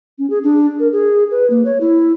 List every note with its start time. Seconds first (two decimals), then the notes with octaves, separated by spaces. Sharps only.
0.18 C#4
0.30 G#4
0.43 D4
0.80 A#4
0.92 G#4
1.31 B4
1.50 A#3
1.65 C#5
1.81 E4